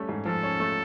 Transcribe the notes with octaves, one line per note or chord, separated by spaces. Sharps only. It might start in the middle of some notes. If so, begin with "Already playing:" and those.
Already playing: G3 A3 C#4
G#2
F3 A4
C#4
A3